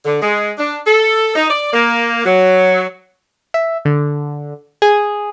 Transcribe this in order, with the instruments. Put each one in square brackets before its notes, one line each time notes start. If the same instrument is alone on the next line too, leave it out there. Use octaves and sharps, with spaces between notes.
[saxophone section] D3
G#3
D4
A4
D#4
D5
A#3
F#3
[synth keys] E5
D3
G#4